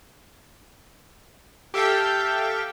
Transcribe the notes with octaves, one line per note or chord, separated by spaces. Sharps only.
G4 A4 E5 F5 G5